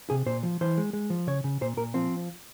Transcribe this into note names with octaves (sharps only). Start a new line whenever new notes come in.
C3 G#4
A#2 C5
F3
E3 C5
G#3
G#3
F3
C#3 C#5
C#3
A#2 C5
A#2 A#4
F3 C4